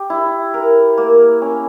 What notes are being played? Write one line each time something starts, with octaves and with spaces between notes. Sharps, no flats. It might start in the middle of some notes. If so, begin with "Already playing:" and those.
Already playing: G4
E4
A#4
A#3
C#4